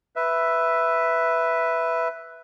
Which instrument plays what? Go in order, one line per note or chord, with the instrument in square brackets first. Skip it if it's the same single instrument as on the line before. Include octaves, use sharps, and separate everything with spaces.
[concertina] B4 E5